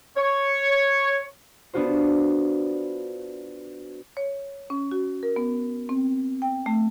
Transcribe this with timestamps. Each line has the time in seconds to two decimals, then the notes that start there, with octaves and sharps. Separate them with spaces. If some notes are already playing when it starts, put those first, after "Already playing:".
0.17 C#5
1.74 B3 D4 F4 F#4 C5
4.17 C#5
4.70 C#4
4.92 F#4
5.23 A#4
5.36 B3
5.89 C4
6.42 G5
6.66 A3